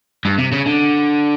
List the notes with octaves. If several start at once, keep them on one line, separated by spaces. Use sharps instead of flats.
G2
C3
C#3
D3